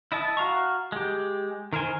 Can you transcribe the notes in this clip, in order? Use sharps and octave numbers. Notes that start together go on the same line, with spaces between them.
E4 D#5 E5 A5
F#4 F5 A#5 C#6
G#3 G4
D#3 A#4 C5 G#5 C6